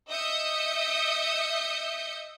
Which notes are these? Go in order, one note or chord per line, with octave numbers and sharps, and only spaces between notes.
D#5 E5 D#6 E6 G6 C#7